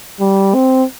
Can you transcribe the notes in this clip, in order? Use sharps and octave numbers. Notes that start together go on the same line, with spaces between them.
G3
C4